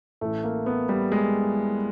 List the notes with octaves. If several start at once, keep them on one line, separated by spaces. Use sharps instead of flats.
A1 A2 E3 A3
A#3
B3
G3
G#3